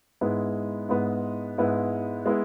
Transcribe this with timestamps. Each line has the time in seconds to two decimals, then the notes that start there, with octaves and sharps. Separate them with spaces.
0.21 G#2 G#3 B3 E4
0.89 G#2 G#3 B3 E4
1.58 G#2 G#3 B3 E4
2.26 G#3 B3 E4